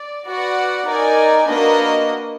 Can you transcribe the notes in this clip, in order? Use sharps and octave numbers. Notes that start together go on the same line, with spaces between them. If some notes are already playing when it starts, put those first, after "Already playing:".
Already playing: D5
F#4 B4 D5 F#5
D#4 A#4 D5 G#5
A#3 D4 F#4 B4 D#5